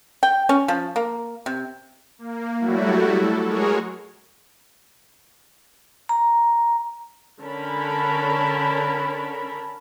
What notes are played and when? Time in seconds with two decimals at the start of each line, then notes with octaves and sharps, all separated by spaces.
0.23 G5
0.49 C#4
0.68 F3
0.96 A#3
1.46 C3
2.18 A#3
2.59 F#3 G3 A3 E4 F#4
3.11 A4
3.44 G#3 F#4 G#4 A#4 C#5
6.09 A#5
7.40 D3 C#4 A#4 A5 B5